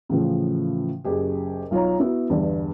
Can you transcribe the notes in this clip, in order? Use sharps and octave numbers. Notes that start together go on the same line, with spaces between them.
A2 C#3 E3 F3
F#1 F#2 G4 G#4
B1 F4 C#5 A#5
B3 E4 F#4
G1 E2 G2